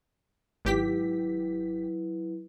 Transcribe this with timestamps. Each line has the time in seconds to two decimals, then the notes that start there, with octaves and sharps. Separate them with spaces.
0.65 G#1 F#3 E4 G4 B4 B6